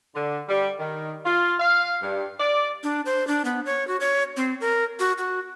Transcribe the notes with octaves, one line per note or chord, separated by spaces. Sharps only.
D3
G3
D#3
F4
F5
G2
D5
D4
C5
D4
B3
C#5
F#4
C#5
C4
A#4
F#4
F#4